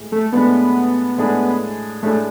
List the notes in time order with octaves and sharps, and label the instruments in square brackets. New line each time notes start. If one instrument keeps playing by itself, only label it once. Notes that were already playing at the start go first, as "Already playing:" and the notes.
Already playing: [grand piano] A2 G#3
[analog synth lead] A3
[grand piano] A2 G#3 D4 G#4 [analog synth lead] B3
[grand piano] A2 G#3 D4 G#4
[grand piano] A2 G#3 D4 G#4 [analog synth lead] A3